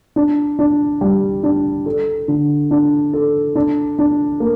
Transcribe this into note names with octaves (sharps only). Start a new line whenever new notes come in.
D4
D4
G3
D4
A4
D3
D4
A4
D4
D4
A#3